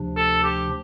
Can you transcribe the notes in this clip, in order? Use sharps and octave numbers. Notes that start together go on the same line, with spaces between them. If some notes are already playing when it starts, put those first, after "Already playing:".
Already playing: D2 C3 F3 D4
A4
G4